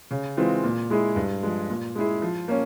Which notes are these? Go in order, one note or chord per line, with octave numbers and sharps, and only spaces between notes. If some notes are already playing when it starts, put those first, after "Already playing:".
C#3
E3 G#3 C4 F4
A#2
G#3 E4 G#4
G2
F3 G#3
A#2
G#3 E4 G#4
F3
A#3 C#4